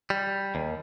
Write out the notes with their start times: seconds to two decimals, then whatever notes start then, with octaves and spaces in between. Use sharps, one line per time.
0.10 G3
0.55 D#2